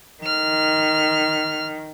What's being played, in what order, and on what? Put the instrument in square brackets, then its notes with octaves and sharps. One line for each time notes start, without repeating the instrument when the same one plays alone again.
[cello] D#3 [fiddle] F6